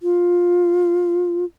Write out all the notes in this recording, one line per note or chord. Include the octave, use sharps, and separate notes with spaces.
F4